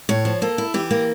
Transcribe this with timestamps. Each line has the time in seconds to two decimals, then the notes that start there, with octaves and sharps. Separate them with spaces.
0.09 A2 C#5
0.25 F3
0.42 A#3 A4
0.58 E4
0.74 E3 G4
0.91 A#3